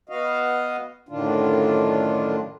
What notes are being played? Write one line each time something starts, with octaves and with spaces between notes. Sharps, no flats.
B3 F#4 D#5 F5
F#2 A2 D3 D#3 D4 F4